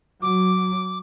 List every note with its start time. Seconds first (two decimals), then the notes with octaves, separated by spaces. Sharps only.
0.22 F#3 D6